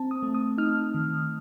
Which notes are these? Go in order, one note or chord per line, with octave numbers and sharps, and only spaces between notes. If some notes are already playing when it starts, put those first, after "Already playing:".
Already playing: C4 A5
D#6
A3
D#6
D#4 F6
D#3